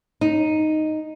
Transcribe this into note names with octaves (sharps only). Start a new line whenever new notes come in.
D#4